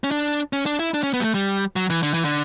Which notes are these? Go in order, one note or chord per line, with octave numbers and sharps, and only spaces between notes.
C#4
D4
C#4
D4
E4
D4
C#4
B3
G3
A3
G3
F#3
E3
D3
E3
D3